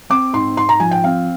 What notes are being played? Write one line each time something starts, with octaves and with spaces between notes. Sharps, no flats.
C4 D6
G#2 C6
G#2 C6
A#5
F3 G#5
G5
C4 F5